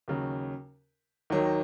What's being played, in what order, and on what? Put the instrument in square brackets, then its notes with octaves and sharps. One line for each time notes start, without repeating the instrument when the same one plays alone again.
[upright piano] D#2 C#3 F#3
D#2 D#3 F#3 A#3 D#4